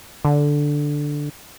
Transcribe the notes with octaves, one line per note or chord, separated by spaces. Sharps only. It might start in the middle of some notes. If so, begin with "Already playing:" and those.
D3